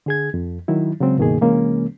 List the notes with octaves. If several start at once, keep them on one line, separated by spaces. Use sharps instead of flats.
D3 G#4 G#6
F2
D#3 F#3 E4
C#3 F#3 G#3 C4
C#2 G2 B2 D#3 A#3 G#4
C3 E3 G#3 A#3 C#4